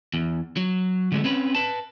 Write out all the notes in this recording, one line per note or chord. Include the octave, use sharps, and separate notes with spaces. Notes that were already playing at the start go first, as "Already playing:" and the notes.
E2
F#3
D3 G#3 A3
C4 C#4 B4
B4 A5